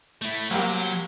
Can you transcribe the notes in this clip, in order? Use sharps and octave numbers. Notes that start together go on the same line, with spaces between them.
A3 E4
C2 F#3 A#3 G4